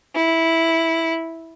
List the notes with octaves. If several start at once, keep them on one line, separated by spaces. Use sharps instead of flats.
E4